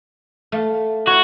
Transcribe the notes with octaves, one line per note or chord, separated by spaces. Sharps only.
A3 F5
E4 F#4 C#5